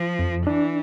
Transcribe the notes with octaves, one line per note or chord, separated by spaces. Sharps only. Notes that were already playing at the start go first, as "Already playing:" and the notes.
Already playing: F3
F2
E3 D4